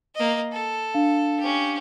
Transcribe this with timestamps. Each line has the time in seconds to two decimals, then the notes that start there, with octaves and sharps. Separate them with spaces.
0.15 A#3 D#5
0.52 A4
0.94 D4 F5
1.39 C#4 G4